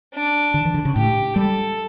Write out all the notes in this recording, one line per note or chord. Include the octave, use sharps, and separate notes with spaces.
D4
D3
E3
D3
C#3
A2 G4
G3 A4